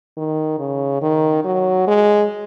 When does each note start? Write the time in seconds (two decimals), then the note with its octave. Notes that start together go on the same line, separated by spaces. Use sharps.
0.17 D#3
0.59 C#3
1.02 D#3
1.44 F#3
1.88 G#3